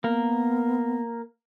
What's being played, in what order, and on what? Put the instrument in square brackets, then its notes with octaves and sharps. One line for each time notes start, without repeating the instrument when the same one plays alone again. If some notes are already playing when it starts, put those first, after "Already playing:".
[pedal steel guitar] A#3 A#4 [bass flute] B3